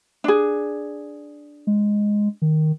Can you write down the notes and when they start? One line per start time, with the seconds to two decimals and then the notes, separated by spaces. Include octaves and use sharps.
0.24 D4 G#4
1.67 G#3
2.42 D#3